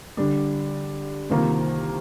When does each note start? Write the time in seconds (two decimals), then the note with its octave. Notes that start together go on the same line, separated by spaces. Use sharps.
0.17 D3 G3 D4
1.30 C2 C3 D#3 A#3 F4